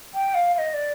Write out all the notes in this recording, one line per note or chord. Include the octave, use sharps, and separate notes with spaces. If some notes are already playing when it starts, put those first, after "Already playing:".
G5
F5
F5
D#5
D5